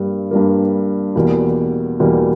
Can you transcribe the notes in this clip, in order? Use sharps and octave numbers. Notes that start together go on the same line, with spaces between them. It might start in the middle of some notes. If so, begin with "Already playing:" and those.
Already playing: G2 G3 A#3
G2 G3 A#3
E2 B2 G3 A#3
E2 B2 G3 A#3